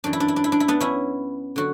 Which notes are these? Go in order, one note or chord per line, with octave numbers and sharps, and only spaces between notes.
F#2 E3 D4
E4
D4
E4
D4
E4
D4
E4
B3 D4
C#4 E4
D3 F#3 F#4